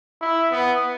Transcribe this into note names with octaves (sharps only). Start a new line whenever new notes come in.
E4
B3